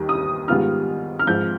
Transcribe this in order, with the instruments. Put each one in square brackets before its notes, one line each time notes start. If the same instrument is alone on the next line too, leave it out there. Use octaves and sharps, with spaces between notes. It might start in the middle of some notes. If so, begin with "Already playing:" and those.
Already playing: [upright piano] D#2 D#3 G3
D#6
G#2 D#3 G3 B3 F4 F6
F6
G#2 F3 C4 G6